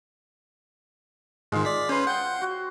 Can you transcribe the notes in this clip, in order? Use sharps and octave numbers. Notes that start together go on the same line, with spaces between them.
G#2 D#3 G#3 F4
D5 B6
C#4 B4 C5 C6
F#5 G5 G6
F#4